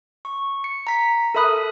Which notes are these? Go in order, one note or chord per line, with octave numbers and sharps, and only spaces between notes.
C#6
C#7
A#5 B6
A4 A#4 E5 B5 D#6 F#6